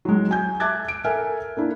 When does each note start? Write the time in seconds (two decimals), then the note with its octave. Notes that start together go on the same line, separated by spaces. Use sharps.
0.05 F#3 G#3
0.31 G#5 G6
0.60 E5 A5 D6 F#6 G#6 A6
0.88 D7
1.04 A4 A#4 E5 G#5 F6
1.57 A#3 D4 E4